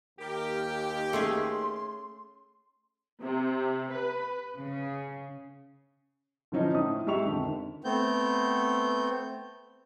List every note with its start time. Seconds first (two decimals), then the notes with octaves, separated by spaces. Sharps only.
0.19 D#2 G4 A#4
1.13 A3 C#4 G#4 C6
3.21 C3
3.91 B4
4.58 C#3
6.52 D3 E3 F3 C#4 D#4 C5
6.74 A2 D#6
7.07 G#3 G4 E5 C#6 F7
7.25 F2 D3 D#3
7.84 A3 B3 C4 G6